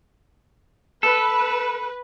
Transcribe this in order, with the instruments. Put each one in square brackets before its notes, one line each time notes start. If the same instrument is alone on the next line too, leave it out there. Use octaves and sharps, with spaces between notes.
[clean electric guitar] A4 [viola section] B4